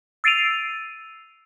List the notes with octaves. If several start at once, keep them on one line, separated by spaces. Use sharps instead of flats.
E6 A6 C7 D7 D#7 F7